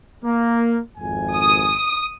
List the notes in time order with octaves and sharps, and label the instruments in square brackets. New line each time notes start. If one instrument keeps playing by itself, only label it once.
[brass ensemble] A#3
G#1 F2 G#5
[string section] D#6